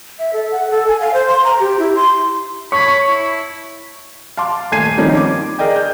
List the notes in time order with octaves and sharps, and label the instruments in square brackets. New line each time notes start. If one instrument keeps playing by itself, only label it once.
[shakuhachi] E5
A4
F#5
A4
G#5
F5
C5
C6
A#5
G4
E4
C6
[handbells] C#5 A5 G#6 [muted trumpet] B5 [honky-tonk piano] C#6
[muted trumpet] E4
[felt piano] F5 A5 C6 D6
D#1 A3 G#5 G#6 C7 D#7
D#3 F3 G3 C4 C#4 D#4
D6
G#4 A#4 D5 D#5 G5
G6